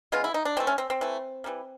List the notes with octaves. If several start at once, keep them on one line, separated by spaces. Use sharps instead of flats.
C#3 E3 G#3 B3 F4
E4
D#4
D4
E3 A3 C4
C#4
C4
C4
E3 A3
E3 G3 A#3